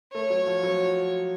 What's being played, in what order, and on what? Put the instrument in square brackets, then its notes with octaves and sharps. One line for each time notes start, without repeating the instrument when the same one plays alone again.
[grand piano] A3 [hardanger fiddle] C#5
[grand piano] F#3
F3
F#3